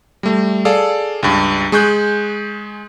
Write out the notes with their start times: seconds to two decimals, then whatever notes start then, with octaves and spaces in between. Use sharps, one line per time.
0.23 G3 A3
0.65 G#4 A4 D5 F5
1.23 C#2 G2
1.72 G#3 G#4 C#6 F#6 G6